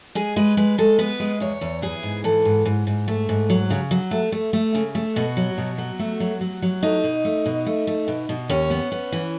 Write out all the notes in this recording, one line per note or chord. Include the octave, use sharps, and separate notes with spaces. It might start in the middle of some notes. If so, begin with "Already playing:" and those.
G#3 G#4
G#3 B4
G#3 B4
G#3 A4
B3 B4
G#3
E2 C#5
E2
E3 G#4
G#2
E3 A4
G#2
G#2
G#2
A3
G#2
F#3
C#3
F#3
A3
A3
A3
C#3
A3
B2 F#4
F#3
B2
F#3
A3
F#3
F#3
F#3
A3 D#4
B2
A3
B2
A3
A3
B2
B2
D#2 C#4
B3
B3
E3